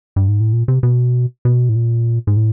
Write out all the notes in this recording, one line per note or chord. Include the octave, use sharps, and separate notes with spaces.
G2
G#2
A2
A#2
C3
B2
B2
A2
A#2
G#2
A2